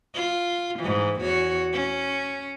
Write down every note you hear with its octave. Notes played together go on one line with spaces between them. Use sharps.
F4
G#2 E3
E2 F#4 C#5
C#4